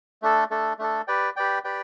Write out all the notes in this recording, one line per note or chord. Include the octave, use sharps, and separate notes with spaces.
A3 D4 A4
A3 D4 A4
A3 D4 A4
G4 B4 D5 G5
G4 B4 D5 G5
G4 B4 D5 G5